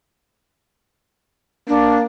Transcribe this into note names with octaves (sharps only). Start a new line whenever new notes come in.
A#3 D4